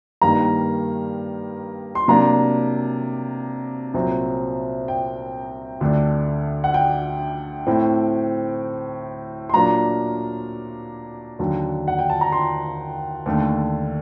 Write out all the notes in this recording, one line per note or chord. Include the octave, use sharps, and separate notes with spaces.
G2 D#3 G3 A#3 A#5
C6
C3 F#3 A#3 D4 A#5
C2 A#2 F#3 C4
G5
D2 D3 A3 D4
F#5
G5
A2 A3 C4
C6
A#2 F#3 A#3 D4 A#5
D#2 D3 F#3
F#5
G5
A5
A#5
C6
D#2 D3 A3